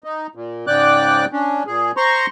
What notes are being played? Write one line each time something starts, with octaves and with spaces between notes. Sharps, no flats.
D#4
A#2
G#2 C#3 D5 G5 D6 F#6
C#4 D4
A#2 G#4
C5 A#5 C6 C#6